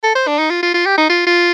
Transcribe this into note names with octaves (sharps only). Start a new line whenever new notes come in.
A4
C5
D4
D#4
F4
F4
F4
G4
D#4
F4
F4